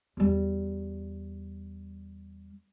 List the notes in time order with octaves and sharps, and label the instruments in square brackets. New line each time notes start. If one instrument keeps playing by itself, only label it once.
[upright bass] E2 G3